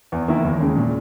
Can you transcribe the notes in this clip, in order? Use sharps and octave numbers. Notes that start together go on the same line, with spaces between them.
E2
D#3 A#3 E4
D#2
C#3 G#3
A#2